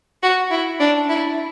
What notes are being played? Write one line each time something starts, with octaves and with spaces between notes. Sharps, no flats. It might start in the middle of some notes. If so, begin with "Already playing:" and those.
F#4
E4
D4
E4